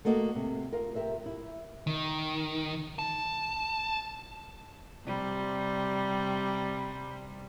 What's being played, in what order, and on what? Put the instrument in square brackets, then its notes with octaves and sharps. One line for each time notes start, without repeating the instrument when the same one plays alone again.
[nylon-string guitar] A3 A#3 F#4 D#5
C3
F4 A#4
G4 A#4 E5
E4
[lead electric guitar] D#3
A5
[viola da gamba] C3 G3